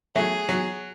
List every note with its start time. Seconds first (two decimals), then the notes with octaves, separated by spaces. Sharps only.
0.16 F#3 A3 G#4
0.49 F#3